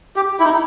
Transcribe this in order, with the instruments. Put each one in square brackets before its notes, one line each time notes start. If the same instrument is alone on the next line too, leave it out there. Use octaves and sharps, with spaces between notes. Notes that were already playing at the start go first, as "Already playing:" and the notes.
[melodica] G4
E4
D#4